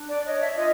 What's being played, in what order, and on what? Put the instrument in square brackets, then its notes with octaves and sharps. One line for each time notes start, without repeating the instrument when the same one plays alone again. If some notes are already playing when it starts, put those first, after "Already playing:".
Already playing: [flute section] D4
D5
C#5 D#5
E5
F4 D#5